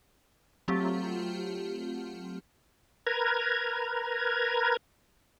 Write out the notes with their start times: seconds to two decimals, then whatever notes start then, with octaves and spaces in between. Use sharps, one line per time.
0.68 F#3 A3 C4 F4 G4
3.07 A#4 B4 A#5 G#6